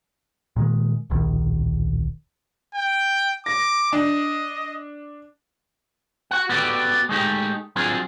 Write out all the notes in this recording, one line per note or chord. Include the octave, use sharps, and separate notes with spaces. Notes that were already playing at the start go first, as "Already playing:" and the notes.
A#2 D#3 G#3
D1 A#1 D#3
G5
D6 A#6
D4 D#5
F#4 F#5
B3 F#4 G4 A4 D5
G#3 A3 D#4 G4
F#3 C4 D4 F4 G#4